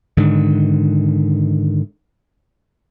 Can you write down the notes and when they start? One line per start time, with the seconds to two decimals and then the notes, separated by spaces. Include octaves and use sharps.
0.17 G#2 D3 D#3